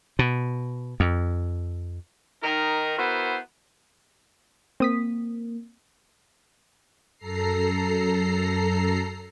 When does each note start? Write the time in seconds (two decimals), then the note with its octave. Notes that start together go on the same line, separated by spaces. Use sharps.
0.19 B2
1.00 F2
2.43 D#3 D#4 A#4
2.98 B3 E4 F#4 A#4 C5
4.80 A#3 C4 D#6 B6
7.18 F#2 A4 A#5 C7